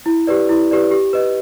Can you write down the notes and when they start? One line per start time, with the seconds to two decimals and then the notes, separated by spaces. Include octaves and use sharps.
0.06 E4
0.27 G4 B4 D5
0.49 E4
0.71 G4 B4 D5
0.91 G4
1.13 B4 D#5